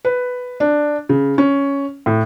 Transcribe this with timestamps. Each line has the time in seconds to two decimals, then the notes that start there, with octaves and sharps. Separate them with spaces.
0.05 B4
0.60 D4
1.09 C#3
1.38 C#4
2.06 A2